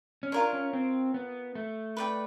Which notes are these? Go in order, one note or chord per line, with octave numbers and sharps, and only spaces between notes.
C#4
D4 F4 A#4 C#5
C#4
C4
B3
A3
B4 D5 G5